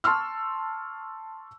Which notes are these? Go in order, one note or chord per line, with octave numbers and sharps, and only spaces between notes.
A5 C6 C#6 E6 F6